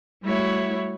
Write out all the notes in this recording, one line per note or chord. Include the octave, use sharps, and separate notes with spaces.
G3 A3 E4 F#4 C#5